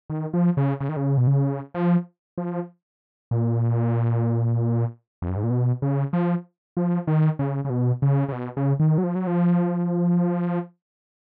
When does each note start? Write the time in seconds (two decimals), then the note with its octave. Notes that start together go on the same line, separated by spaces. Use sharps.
0.10 D#3
0.34 F3
0.57 C#3
0.80 C#3
0.89 D#3
0.97 C#3
1.18 B2
1.27 C#3
1.74 F3
2.38 F3
3.31 A#2
5.22 F2
5.29 F#2
5.36 G#2
5.43 A#2
5.50 B2
5.82 C#3
6.13 F3
6.77 F3
7.07 D#3
7.39 C#3
7.65 C#3
7.70 B2
8.02 C#3
8.29 C#3
8.32 B2
8.57 C#3
8.79 D#3
8.98 F#3
9.04 F3
9.15 F#3
9.27 F3